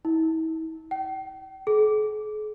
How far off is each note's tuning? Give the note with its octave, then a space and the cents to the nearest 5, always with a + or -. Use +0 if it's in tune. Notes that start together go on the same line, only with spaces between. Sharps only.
E4 -40
G5 -40
G#4 +45